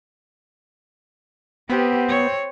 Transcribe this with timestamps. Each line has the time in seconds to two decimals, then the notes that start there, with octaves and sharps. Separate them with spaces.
1.70 B3 C4 G4 B4
2.09 C#5